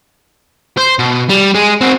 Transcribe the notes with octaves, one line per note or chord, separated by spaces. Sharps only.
C5
B2
G3
G#3
C4 F#4